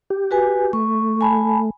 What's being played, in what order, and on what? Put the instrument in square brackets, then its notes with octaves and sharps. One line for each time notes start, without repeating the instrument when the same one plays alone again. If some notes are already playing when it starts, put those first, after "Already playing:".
[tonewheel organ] G4
[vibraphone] F#4 B4 G#5
[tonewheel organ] A3 [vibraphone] C#6
[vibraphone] G#5 A5 B5